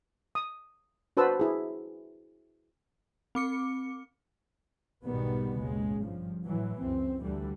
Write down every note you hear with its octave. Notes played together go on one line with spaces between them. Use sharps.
D#6
D4 F#4 B4 C5 A5 E6
E4 G#4
C4 D6 C#7
B1 G#2 B2 D#3 G3 B3
G#1 D#2 C#3 G#3
G2 F3
A2 E3 F#3
C#2 F#2 C4
D2 D3 E3 G3 A3